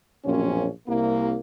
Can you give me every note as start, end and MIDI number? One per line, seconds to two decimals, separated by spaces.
0.25 0.66 34
0.25 0.66 42
0.25 0.66 47
0.25 0.66 58
0.25 0.66 60
0.25 0.66 61
0.87 1.37 36
0.87 1.37 58